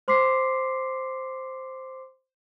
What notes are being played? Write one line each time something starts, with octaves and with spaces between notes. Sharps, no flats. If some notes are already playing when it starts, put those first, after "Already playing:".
C5 C6 D6 B6 C7